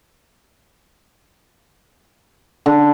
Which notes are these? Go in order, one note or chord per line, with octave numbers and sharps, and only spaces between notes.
D3